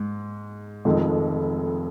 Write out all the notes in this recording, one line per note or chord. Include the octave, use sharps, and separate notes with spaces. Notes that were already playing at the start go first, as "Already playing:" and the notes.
Already playing: G#2
F1 F2 D#3 G#3 D#4